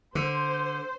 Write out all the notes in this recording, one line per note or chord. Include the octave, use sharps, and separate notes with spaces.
D3 C5